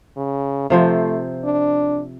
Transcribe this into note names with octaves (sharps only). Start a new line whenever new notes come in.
C#3
C3 F3 A3 C5
D4